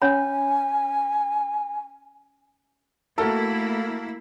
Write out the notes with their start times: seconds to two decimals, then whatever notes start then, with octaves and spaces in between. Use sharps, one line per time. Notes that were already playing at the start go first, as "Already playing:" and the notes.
0.02 C#4 C#5 G#5 B5
3.18 A3 A#3 E4 F#4 A4 A#4